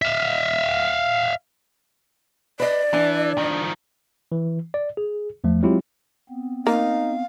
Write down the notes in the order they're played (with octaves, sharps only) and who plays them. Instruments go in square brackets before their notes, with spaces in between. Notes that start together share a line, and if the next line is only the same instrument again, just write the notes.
[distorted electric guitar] E5 F5
[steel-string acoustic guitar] B4 D#5 [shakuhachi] D5
[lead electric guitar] E3 [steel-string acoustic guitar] D4
[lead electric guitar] D#3 F3
[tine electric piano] E3
D5
G#4
E2 F3 A3
F#3 G#3 C4 E4 F4 G4
[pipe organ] B3 C4
[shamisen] A#3 [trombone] D#4 [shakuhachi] F5